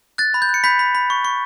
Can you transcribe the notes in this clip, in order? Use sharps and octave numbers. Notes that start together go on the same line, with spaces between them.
F#6 A6
B5
G6
F#6
C#7
B5 G6 B6
B5
B5
C#6
C#6